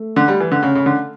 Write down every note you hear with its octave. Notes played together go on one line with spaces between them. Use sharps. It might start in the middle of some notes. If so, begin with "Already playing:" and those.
Already playing: A3
D3
G3
E3
D3
C#3
C#3
D3